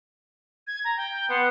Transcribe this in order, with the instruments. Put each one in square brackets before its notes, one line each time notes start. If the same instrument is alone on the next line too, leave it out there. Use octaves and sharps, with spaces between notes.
[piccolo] G#6
A#5
G5
[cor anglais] B3 [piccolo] C6